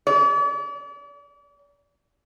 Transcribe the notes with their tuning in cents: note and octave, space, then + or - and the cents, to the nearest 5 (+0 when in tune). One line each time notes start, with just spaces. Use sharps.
D5 -40